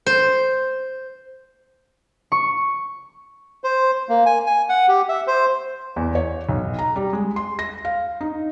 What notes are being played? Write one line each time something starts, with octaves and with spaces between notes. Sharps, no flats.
C5
C#6
C5
A#3
G#5
G#5
F#5
G4
E5
C5
E2
C#5
B1
A#5
G3
G#3
C6
A#6
F5
D#4